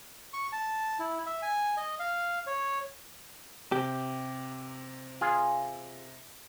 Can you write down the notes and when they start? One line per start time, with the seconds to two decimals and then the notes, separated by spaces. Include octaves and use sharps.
0.33 C#6
0.52 A5
0.99 E4
1.26 E5
1.42 G#5
1.77 D#5
1.99 F5
2.47 C#5
3.72 C3 G4
5.21 F4 G#4